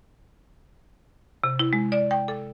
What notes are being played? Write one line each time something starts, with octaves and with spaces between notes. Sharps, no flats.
C3
E4
G#3
D5
G5
A4